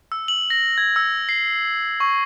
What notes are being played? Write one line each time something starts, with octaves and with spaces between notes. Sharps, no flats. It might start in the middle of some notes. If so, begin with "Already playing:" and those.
E6
F#7
A#6
G#6
E6
C7
C#6